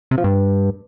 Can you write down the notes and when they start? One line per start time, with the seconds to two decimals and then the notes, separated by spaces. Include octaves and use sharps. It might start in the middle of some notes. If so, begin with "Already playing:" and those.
0.11 C3
0.18 F3
0.24 G2